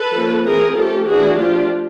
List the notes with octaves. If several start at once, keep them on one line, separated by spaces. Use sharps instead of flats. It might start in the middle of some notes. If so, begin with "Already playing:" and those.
Already playing: A4 B4
F3 A#3 C#4
E3 A3 C4 G#4 A#4
F3 A3 C#4 G4 A4
E3 A3 D4 F#4 G#4
F3 A3 D4 F4 G4